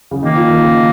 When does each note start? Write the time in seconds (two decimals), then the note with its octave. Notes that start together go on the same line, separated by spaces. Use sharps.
0.11 C#3
0.23 D#3 A#3
0.35 F3
0.50 D#3
0.62 C#3
0.75 D#3